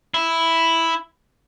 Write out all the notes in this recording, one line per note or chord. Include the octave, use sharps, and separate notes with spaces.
E4